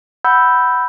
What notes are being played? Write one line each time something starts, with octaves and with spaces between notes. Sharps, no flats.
F#5 B5 E6 G6